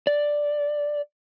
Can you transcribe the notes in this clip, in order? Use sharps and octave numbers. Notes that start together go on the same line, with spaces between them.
D5